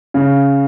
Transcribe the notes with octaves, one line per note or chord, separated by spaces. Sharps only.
C#3